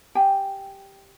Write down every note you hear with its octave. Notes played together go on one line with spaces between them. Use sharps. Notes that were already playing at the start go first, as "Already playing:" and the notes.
G4 G5 G#5